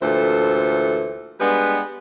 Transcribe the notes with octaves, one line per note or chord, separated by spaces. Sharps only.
D2 A#2 E3 A4 C5
G3 G#3 B3 D4 B4